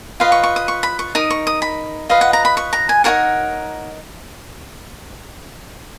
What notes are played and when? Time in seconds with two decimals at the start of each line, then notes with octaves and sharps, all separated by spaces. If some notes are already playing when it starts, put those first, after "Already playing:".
0.20 F4 B4 D#5 F5
0.32 C#6
0.43 C#6
0.56 D#6
0.68 C#6
0.83 B5
0.99 C#6
1.15 D#4 A#4 D#6
1.30 C#6
1.47 D#6
1.62 B5
2.09 F4 B4 D#5 F5
2.21 F#5
2.33 A#5
2.45 B5
2.57 C#6
2.73 A#5
2.89 G#5
3.04 D#4 F#4 A#4 C#5 F#5